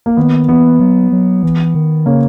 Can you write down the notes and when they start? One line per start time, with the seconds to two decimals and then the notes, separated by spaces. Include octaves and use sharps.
0.06 A#3
0.17 D#3 B3
0.48 E3 B3
0.80 F#3
1.12 F#3
1.43 E3
1.74 D#3
2.06 C#3 A#3 C#4